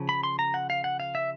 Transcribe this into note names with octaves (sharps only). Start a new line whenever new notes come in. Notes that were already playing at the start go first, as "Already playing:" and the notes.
Already playing: C#3 F3
B5
C6
A#5
F#5
F5
F#5
F5
E5